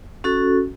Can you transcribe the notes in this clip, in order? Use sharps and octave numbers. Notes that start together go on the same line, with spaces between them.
C#4 F#4 A4